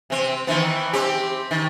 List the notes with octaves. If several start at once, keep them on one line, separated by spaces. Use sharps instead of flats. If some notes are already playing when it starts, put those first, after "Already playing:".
C3 C4
D#3 E3 B3
C4 G4
D#3